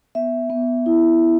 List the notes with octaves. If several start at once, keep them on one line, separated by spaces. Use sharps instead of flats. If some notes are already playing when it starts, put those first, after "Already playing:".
B3 E5
B3
E4